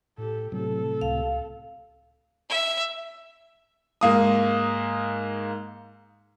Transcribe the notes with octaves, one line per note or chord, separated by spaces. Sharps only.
A2 G4 A4
A2 C3 F#3 A4
C#2 F5
E5
G#2 A#3 D#6